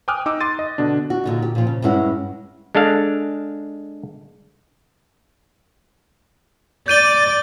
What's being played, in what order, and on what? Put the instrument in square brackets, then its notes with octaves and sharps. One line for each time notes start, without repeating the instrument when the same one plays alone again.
[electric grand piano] G5 G#5 D6 D#6 F6 F#6
D#4 D6 E6
C6 D6 A6 D#7
D#5
B2 D3 D4
[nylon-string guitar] F#4
A#2 D3 D#4
G4
A#2 F3
C#3
G2 G#3 C#4 E4 F#5
[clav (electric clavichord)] G#3 D4 A4 F5
[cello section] D5 [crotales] G6 D#7 G7